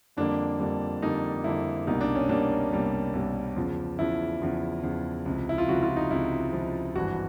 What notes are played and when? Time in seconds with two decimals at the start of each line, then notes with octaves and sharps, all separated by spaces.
0.17 F2 D3 G3 A#3 D4
0.60 F2 D3 G3 A#3
1.02 F2 D3 G3 A#3 D#4
1.44 F2 D3 G3 A#3 E4
1.87 C2 B2 G3 A#3 D#4
2.01 D4
2.15 C#4
2.29 C2 B2 G3 A#3 D4
2.71 C2 B2 G3 A#3
3.13 C2 B2 G3 A#3
3.56 E2 C#3 F3
3.98 E2 C#3 F3 E4
4.42 E2 C#3 F3
4.83 E2 C#3 F3
5.26 C#2 C3 F3
5.49 E4
5.58 F4
5.68 C#2 C3 F3 F#4
5.83 F4
5.96 D#4
6.11 C#2 C3 F3 E4
6.52 C#2 C3 F3
6.95 G#1 G2 E3 F#4